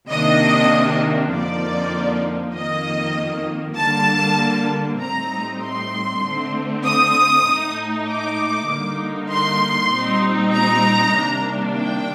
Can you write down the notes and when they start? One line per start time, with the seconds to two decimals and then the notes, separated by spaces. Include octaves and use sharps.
0.09 C3 D#3 A#3 D4 D#5
1.32 F2 D3 F3 A#3 D#4 D5
2.54 F2 D#3 A#3 D#5
3.77 D3 G3 A#3 A5
5.00 A2 G3 C4 D#4 A#5
5.62 C6
6.23 D3 A3 C4
6.85 D#6
7.47 A2 A3 D#4
8.07 D6
8.68 D3 G3 A#3 D#4
9.30 C6
9.91 A#2 G3 C4 D#4
10.53 A#5
11.14 C3 D#3 G3 A#3 D4
11.75 G5